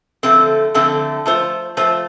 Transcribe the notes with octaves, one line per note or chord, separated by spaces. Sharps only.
D3 F3 A3 C4 A4
D3 F3 A3 C4 A4
F3 A3 F4 C5
F3 A3 F4 C5